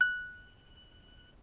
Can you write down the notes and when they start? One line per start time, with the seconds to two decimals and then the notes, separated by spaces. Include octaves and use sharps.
0.01 F#6